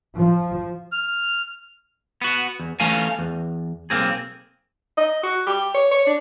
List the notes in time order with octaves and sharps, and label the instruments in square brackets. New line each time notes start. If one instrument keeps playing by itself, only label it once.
[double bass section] F3
[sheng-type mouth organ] F6
[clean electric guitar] B3 F#4
E2
E3 A3 C#4 F5 G#5
E2
B1 G2 A#3 C4 G#4
[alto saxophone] D#5
F#4
G4
C#5
C#5
D4